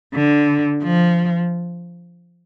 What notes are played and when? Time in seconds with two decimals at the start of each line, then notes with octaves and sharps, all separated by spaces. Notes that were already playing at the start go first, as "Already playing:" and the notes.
0.15 D3
0.83 F3